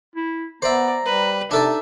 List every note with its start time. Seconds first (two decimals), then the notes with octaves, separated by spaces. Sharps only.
0.16 E4
0.62 B3 C5 D5 E5 A#5
1.06 G3 B4
1.51 C3 D4 D#4 A4 D5 E5